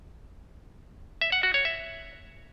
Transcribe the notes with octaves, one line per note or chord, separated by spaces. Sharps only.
E5
F#5
F#4
C#5
E5